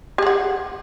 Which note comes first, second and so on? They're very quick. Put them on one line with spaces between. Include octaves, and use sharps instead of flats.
G4 G#4 F#5